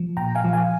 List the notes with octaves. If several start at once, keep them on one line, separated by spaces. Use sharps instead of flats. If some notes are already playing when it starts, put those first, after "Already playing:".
Already playing: F3
A#2 G5 A#5
F5 G#5
F3
F5 G#5